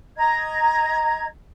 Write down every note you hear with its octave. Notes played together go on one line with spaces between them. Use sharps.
D#5 A#5 G#6